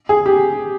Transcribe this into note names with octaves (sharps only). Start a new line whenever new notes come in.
G#4
G4